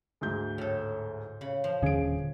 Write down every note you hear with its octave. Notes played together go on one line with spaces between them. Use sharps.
D2 G#2 G6
A2 A4
C#3 B5
F3
D#1 D3 C#4 G#4 D7